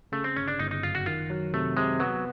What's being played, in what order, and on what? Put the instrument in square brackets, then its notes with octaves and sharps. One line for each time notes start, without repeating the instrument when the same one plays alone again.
[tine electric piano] C#3 [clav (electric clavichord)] A3
[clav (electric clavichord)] C4
[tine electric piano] G1 [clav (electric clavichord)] C#4
[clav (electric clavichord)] D4
[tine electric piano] G1 [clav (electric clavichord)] D#4
[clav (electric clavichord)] D#4
[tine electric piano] F#2 [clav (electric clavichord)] F4
[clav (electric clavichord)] F#4
[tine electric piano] D#3 [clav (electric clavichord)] F4
[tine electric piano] F#3
[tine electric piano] C3 [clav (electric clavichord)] A3
[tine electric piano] C3 [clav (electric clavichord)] G#3
[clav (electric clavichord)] F#3 [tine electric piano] B3